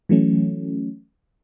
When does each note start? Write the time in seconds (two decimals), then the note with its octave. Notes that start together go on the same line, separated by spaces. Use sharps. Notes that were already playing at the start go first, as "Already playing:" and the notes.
0.09 E3 F#3 A3 C#4